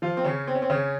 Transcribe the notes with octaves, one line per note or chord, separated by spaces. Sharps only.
F3 F4
C4
C#3 C#4
C4
C#4
C4
C#3 C#4